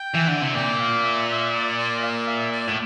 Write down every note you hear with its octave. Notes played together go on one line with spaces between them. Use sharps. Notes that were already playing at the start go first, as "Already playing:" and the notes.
Already playing: G5
E3
D3
C3
A#2 G5
F5
E5
E5
D5
D5
F5
E5
D5
A2